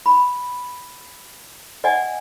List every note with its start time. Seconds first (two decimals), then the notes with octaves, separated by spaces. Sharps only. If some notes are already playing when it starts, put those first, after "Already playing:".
0.06 B5
1.84 D5 D#5 F#5 G#5